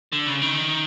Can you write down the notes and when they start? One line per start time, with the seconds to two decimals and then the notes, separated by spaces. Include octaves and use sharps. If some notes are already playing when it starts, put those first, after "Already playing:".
0.12 D3
0.27 C#3
0.42 D#3